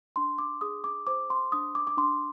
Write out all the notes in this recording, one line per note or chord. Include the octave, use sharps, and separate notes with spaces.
D4 C6
D6
G#4 D#6
D6
C5 D6
C6
D4 D#6
D6
D6
D4 C6